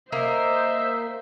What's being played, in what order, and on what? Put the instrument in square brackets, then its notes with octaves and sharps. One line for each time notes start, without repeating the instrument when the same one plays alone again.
[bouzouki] A#3 [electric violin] C5 [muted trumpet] D#5 [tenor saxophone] E5